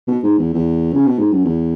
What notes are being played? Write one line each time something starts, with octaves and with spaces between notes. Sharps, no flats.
B2
G#2
E2
E2
C#3
B2
G#2
F#2
E2